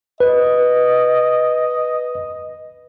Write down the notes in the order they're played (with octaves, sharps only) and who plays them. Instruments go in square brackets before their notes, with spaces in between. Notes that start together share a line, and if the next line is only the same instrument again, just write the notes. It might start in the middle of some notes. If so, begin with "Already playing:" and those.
[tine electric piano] B4 [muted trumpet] D#5